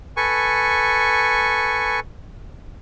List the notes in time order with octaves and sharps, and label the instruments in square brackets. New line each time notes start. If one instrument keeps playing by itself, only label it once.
[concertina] A4 B4 G#5 C#6